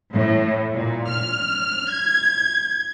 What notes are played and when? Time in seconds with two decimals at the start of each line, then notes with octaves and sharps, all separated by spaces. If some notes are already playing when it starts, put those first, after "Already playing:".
0.13 A2
0.72 A#2
1.08 F6
1.90 G#6